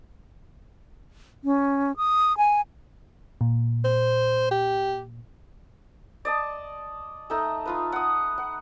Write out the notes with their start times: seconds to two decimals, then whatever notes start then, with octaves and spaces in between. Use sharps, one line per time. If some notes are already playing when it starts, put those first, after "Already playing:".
1.44 C#4
1.97 D#6
2.37 G#5
3.41 A#2
3.85 C5
4.51 G4
6.25 D5 D#5 A5
7.30 A3 D#4 A4
7.66 D#4 F4 B4
7.92 F#5 D#6
8.38 F#5